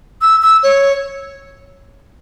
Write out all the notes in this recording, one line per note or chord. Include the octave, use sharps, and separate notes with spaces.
E6
E6
C#5